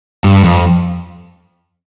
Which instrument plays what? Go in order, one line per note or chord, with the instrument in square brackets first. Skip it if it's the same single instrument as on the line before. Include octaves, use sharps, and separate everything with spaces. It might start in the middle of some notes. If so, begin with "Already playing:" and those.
[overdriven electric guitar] G2
F2